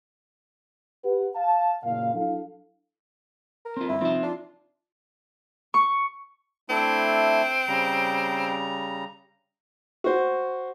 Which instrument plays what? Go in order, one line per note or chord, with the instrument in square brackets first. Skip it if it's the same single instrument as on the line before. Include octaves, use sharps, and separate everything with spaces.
[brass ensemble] G4 B4 F#5
F5 A5
F#1 A#2 F5
F#3 D4 E4 A4 F5
[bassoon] A#4
[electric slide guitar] C4 F4
[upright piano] G1 [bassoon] E4
[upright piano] F3 D#4 [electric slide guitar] C4 E5
[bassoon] D4 [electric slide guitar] F4
[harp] C#6
[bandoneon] A3 D4 E4 [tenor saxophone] C4
[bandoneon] C#3 G3 A#5
[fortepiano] F#4 C5